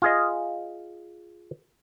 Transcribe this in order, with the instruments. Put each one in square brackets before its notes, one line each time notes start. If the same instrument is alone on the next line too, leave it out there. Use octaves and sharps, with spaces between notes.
[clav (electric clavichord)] F4 G#4 D#5